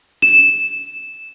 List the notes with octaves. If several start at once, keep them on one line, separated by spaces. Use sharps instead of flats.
E7